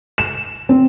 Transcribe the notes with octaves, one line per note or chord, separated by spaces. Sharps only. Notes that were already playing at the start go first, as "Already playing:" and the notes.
E7
C4